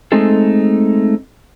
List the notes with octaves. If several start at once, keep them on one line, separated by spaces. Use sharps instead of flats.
G#3 A3 C4 D#4 G#4 A4